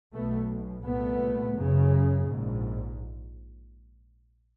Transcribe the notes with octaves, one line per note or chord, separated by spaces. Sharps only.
B1 B2 A3 B3
C2 A#2 A3 B3
F#1 F#2 C#3
A#1 G#2